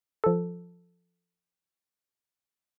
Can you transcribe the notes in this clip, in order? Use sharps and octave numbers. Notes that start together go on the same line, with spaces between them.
F3 A4